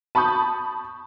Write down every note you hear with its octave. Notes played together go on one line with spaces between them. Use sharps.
A5 B5 C#6 D#6 G6